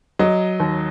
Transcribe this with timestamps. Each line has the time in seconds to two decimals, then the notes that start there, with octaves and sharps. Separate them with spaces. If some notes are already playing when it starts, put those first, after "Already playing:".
0.19 F#3 D#5
0.60 D#2